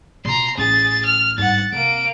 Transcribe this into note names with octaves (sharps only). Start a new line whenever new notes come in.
B2 F4 A#5 C6
A1 C#4 G#4 A6
F6
G#1 G2 F#5 A6
C3 A#3 D7